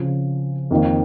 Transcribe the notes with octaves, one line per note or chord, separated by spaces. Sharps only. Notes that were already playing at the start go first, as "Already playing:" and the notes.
Already playing: C#3 F3 C4
F2 D#3 A#3